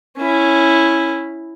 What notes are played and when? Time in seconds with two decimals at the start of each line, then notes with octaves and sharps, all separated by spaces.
0.17 C#4 E4